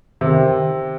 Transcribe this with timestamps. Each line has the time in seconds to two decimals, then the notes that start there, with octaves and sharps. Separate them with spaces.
0.21 C3 D#3